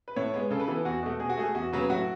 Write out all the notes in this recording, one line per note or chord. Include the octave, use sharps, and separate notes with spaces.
B4
A2 C#5
G#3 B3
C#3 A4
B4
E3 B3 A4
E2 F#4
B2 A3
B2 G#4
F#4
A3 G#4
E2 F#4
C#3 F#3 B3
A2 F#4